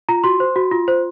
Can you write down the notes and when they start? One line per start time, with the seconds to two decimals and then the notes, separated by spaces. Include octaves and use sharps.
0.09 F4 A#5
0.24 F#4 C6
0.40 C5
0.56 F#4
0.71 F4
0.88 C5